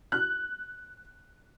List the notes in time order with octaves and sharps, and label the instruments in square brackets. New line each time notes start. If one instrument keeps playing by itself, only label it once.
[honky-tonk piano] F#6